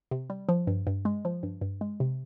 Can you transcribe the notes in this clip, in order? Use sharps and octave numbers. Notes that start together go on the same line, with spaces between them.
C3
G3
F3
G2
G2
G#3
F3
G2
G2
G#3
C3